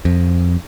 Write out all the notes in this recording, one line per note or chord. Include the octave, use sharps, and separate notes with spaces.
F2